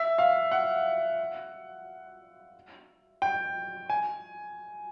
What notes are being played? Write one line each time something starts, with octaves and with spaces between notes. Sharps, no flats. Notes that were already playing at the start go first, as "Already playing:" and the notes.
Already playing: E5
F5
F#5
G5
G#5